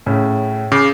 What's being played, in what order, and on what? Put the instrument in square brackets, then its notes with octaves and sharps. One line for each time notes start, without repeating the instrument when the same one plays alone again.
[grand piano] A2 C#3
[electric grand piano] C#3 [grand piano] D6